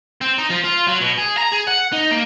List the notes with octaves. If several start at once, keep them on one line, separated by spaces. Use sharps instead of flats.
C4
D#4
F3
F4
F#3
B2
G#4
A#5
G#4
F#5
D#4
A#3